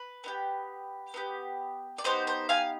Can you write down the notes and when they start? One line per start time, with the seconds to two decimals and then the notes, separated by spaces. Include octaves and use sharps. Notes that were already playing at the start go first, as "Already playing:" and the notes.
Already playing: B4
0.24 B3 D#4 G4
1.14 B3 D#4 G4
1.98 D5
2.04 B3 D#4 G4 C5
2.27 C5
2.49 F5 G#5